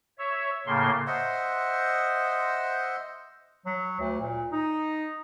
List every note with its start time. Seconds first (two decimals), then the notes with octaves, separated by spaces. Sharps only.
0.18 C#5 E5
0.67 A2 C#3 A#3 C6
1.07 C5 D#5 E5 F#5
3.66 F#3
4.00 D2
4.20 A#2
4.51 D#4